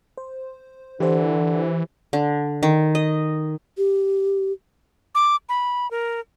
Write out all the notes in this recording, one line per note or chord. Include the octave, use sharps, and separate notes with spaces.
C5
D3 E3 G4 C5
D3
D#3
D#5
G4
D6
B5
A#4